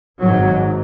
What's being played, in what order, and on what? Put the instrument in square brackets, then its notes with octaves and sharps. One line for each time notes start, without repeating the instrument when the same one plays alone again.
[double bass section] G#1 G#2 F#3